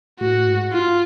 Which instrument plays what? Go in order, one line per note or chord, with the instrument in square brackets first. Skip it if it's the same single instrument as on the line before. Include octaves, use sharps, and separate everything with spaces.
[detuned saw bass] A2 [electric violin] F#4
[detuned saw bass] G#2
[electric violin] F4